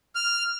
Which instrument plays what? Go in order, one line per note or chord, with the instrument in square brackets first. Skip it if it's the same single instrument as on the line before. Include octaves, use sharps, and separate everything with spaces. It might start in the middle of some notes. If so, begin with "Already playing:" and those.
[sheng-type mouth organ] F6